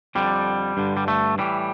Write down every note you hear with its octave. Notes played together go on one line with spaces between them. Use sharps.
F2 D3 G3
G2 D3
G3
A3
A2 E3 G3